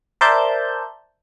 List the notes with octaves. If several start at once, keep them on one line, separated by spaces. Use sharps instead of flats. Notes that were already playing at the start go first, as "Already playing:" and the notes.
A#4 C5 D5 E5 A5 G6